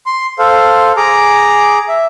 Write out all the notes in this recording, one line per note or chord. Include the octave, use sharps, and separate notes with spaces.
C6
A4 C5 F5
G#4 A#5 D6
E5